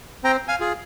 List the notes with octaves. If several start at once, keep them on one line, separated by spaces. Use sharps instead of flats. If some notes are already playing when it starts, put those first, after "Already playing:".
C4 G5 A#5
F5 G#5
F4 G#4